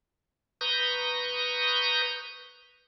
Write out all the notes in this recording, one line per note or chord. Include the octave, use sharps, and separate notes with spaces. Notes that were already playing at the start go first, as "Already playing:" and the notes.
B4 A#5 C#6 D#6 G6